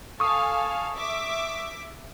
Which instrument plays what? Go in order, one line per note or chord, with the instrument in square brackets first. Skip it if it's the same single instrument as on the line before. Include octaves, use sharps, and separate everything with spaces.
[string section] A4 F5 G#5 [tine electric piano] C#6 D#6
[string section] E5 D6